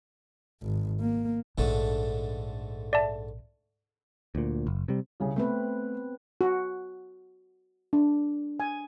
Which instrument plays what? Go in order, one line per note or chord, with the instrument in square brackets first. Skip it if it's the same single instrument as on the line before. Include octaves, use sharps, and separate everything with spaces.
[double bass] G#1
A#3
[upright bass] A#1 [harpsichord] G#2 D3 A3
[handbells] D5 E5 A5
[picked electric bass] D2 A#2
F#1
C3 G3
[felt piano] C2 C#3
[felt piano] A3 [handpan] B3 C4 B4
[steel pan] F#4
D4
G#5